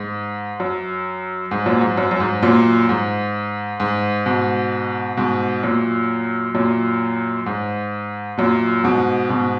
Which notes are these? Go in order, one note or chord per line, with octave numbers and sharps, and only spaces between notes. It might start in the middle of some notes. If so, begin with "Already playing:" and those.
Already playing: G#2
F#2
G#2
F#2 A#2
G#2
F#2
F#2
G#2
F#2 A#2
G#2
G#2
G#2 B2
G#2 B2
F#2 A#2
F#2 A#2
G#2
F#2 A#2
G#2 B2
G#2 B2